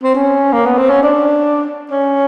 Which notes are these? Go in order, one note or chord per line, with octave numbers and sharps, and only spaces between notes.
C4
C#4
A#3
B3
C4
C#4
D4
C#4